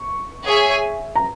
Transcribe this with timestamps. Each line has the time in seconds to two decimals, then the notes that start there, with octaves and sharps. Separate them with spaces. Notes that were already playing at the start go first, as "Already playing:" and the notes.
Already playing: C#6
0.45 G#4 C#5 E5 G#5
1.16 A#5